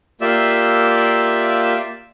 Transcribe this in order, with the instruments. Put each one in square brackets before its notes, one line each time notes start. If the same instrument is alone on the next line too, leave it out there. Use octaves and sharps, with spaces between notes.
[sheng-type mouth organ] A#3 F4 G4 D5 E5 E6